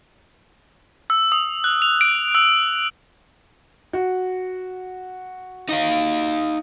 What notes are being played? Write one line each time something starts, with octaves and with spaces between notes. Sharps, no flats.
E6
D#6
F#6
F7
D7
E6
F#4
D#4 D#5 F5